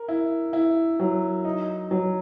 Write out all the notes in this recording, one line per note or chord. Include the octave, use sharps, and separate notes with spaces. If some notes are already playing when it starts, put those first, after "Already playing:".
Already playing: A#4
E4
E4
F#3
D#4
F#3